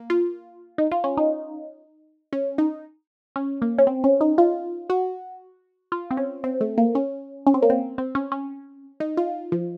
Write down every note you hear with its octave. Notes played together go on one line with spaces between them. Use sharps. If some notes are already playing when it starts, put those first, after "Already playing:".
Already playing: A#3
F4
D#4
F4
C#4
D#4
C#4
D#4
C#4
A#3
C#4
C4
C#4
D#4
F4
F#4
F4
C4
C#4
C4
A3
A#3
C#4
C#4
C4
A#3
C4
C4
C#4
C#4
D#4
F4
F3